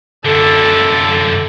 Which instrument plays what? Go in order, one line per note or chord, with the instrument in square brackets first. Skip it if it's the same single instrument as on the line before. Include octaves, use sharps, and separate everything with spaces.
[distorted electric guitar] F#2 D3 [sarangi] A4